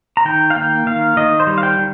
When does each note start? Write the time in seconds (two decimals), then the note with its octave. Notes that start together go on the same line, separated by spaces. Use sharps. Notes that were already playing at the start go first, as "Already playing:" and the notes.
0.17 A#5
0.25 D#3 G5
0.50 F5
0.55 A#3 G5
0.86 D#3 F5
1.17 D#3 D#5
1.40 C5
1.47 G3
1.58 F5
1.63 G5
1.79 D#3